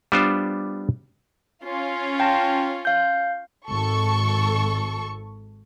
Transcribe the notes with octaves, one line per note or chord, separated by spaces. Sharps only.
G3 B3 D4 F4 C5
C#4 F4
G5 A5 A#6
F5 G6
G#1 A4 C#6